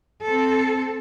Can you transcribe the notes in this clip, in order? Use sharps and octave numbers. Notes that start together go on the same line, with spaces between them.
C4 A4